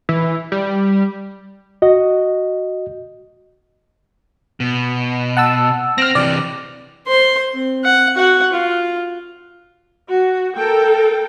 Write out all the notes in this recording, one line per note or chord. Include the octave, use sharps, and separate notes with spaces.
E3
G3
F#4 D#5
B2
F#5 A5 E6
C4 F6 A#6
C3 E3 D5
C5 C6
C4
F#5
F#4 F#5
F4
F#4
A4 A#4 G5